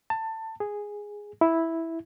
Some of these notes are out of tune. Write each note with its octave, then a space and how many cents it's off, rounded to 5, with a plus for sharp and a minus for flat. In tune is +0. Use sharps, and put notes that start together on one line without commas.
A5 +20
G#4 -5
E4 -5